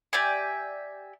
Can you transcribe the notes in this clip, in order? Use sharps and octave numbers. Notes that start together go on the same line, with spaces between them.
G4 D5 E5 G#5